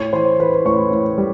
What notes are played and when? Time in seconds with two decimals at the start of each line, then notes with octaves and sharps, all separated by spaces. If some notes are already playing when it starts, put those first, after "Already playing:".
Already playing: A2 C#5 C#6
0.13 E3 C5 C6
0.39 E3 B4 B5
0.65 A2 C#5 C#6
0.91 A2
1.18 G3